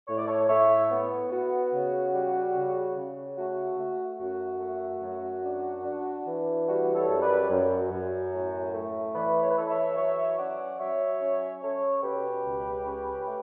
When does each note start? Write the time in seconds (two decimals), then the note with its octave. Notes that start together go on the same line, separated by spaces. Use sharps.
0.07 A2 C#5
0.18 D5
0.27 A4 C#5
0.48 A2 C#5 E5
0.91 B3
1.31 B3 F#4
1.72 C#3
2.13 G3
2.56 C#3
2.96 C#3
3.38 A3 F#4
3.79 A3
4.19 F#2 F#4
4.61 A3
5.02 F#2
5.43 D4
5.84 D4
6.26 E3
6.68 G3 F#4
6.95 A4 C#5
7.08 F#2
7.22 B4 D5
7.49 F#2
7.91 F#2
8.33 A2
8.73 A3
9.15 E3 B4 D5
9.42 C#5
9.50 B4
9.56 E3 A4 C#5
9.69 C#5 E5
9.96 F#3 C#5 E5
10.38 C#4 D5 F#5
10.79 F#3 C#5 E5
11.20 C#4
11.62 C#4 A4 C#5
12.03 B2 G4 B4
12.45 C#2
12.85 C#4
13.26 A3